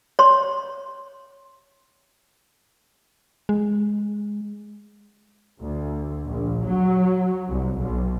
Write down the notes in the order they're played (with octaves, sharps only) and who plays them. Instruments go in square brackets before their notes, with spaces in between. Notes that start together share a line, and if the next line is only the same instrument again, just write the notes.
[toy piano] C#5 C6
[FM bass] G#3
[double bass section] D2
A#1
F#3
C2
B1